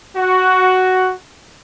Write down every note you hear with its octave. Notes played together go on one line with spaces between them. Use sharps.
F#4